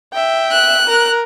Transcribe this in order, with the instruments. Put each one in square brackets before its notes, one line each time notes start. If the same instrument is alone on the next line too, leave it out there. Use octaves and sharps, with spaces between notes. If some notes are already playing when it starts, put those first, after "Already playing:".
[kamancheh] E5 G5
[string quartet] F#6
[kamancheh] A#4